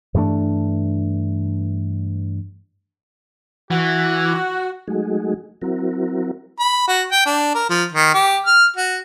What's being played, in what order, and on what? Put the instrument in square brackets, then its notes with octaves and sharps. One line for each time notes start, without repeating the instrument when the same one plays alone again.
[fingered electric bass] G2 E3 A3 D4
[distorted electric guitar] E3 [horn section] F#4
[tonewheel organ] F#3 G#3 A3 D#4 F#4 G#4
F#3 C4 E4 F#4 A#4
[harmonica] B5
F#4
G5
D4
A#4
F3
D#3
G4
F6
F#4